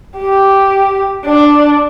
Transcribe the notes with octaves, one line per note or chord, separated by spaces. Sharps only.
G4
D4